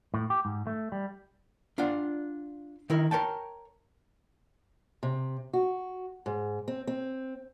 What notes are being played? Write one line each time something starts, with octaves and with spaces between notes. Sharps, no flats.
A2
G4
G#2
A3
G3
D4 F4 D5 F#5
D#3 E4 A#4
A#4 C#5 G5 A5
C3
F#4
G#2
C4
C4